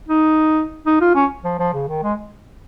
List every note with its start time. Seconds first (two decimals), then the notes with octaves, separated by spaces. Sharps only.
0.08 D#4
0.86 D#4
1.01 F4
1.15 C#4
1.44 F3
1.59 F3
1.73 C#3
1.88 D#3
2.03 G#3